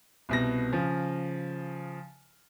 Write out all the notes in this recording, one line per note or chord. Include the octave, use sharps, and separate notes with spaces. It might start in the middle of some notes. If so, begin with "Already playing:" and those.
C2 B2 A#6
C#3 F3